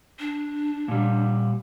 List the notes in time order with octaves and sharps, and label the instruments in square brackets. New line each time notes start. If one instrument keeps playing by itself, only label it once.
[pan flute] D4
[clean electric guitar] A#2 G3